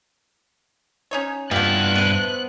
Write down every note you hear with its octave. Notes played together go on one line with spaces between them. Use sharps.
C#4 D#4 C#5
G2 A3 B3 E4 F4 G4 F#6
B3 C5